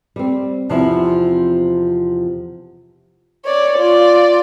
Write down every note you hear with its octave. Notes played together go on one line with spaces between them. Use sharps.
G3 C4
E2 C3 F3 C4 E4
C#5 D5
F4 D5